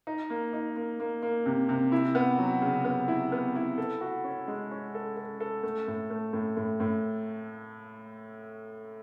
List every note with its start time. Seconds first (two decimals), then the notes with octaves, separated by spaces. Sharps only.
0.07 D#4
0.30 A#3
0.53 D#4
0.76 A#3
1.00 A#3
1.22 A#3
1.46 C3
1.69 C3
1.92 E4
2.15 B3
2.38 F#3
2.62 C#3
2.84 B3
3.08 E4
3.32 B3
3.55 E4
3.78 A4
4.01 F#4
4.24 C#4
4.48 G#3
4.71 C#4
4.95 A4
5.17 A4
5.40 A4
5.63 A3
5.88 A2
6.10 A3
6.33 A2
6.57 A2
6.80 A2